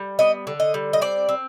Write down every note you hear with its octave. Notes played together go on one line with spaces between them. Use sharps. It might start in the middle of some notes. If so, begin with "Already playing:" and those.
Already playing: G3
B3 D#5
D3
D#5
G3
D#5
C4 D5
C4